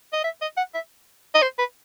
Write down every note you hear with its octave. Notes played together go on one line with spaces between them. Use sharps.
D#5
E5
D#5
F#5
E5
D#5
C5
B4